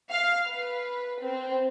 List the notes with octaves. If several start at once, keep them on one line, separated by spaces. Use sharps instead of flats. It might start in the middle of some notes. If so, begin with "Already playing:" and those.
F5
B4
C4